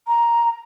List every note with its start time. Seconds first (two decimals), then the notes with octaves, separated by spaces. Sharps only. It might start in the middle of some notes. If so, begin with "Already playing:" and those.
0.07 A#5